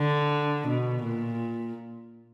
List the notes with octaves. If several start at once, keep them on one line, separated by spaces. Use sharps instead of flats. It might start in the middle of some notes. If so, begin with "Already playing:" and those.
Already playing: D3
B2
A#2